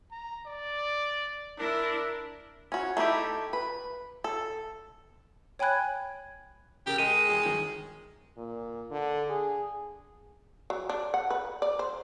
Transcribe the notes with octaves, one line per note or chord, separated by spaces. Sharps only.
A#5
D5
D4 E4 A#4
C#4 F#4
A3 D#4 E4 G4
B4
A4
C#5 G5 G#5 B5 F#6 G#6
C#3 G4 A#4 F7
G#3 A#4 D#5 G5 D#7
E2 G#4
G1 D#3
A#2
D3
G#4
F#3
D4
F#5
B4
D5
C5